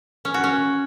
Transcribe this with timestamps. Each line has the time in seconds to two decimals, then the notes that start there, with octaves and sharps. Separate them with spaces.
0.25 C#4
0.34 F#4
0.44 C#4